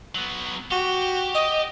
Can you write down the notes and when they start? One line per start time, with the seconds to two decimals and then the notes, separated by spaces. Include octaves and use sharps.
0.15 F#3 B3
0.71 F#4 G4
1.34 D#5